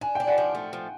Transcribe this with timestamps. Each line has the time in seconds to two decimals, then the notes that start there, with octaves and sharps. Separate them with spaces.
0.01 D4 G#5
0.15 D4 G5
0.27 F#5 G#5
0.38 F3
0.55 A3
0.73 F3